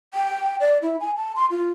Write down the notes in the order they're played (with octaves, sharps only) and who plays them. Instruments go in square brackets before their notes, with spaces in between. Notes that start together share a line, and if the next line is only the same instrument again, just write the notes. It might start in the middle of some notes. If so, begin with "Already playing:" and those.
[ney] G5
D5
E4
G#5
A5
C6
F4